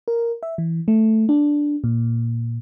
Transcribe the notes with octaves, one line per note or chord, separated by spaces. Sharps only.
A#4
E5
E3
A3
D4
A#2